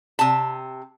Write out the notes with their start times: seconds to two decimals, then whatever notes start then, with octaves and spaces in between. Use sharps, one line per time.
0.19 C3 A5